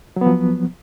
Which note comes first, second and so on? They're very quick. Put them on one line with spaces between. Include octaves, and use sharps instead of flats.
F#3 B3 F3